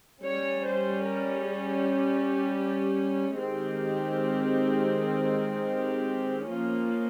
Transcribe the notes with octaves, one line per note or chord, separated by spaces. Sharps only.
G3 C#4 C#5
C5
A#4
G#4
G4
D#3 G#3 C4 G4
G4
F3 A#3 C#4 F4